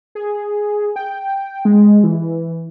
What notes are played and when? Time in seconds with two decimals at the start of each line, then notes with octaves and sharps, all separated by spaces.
0.15 G#4
0.96 G5
1.65 G#3
2.03 E3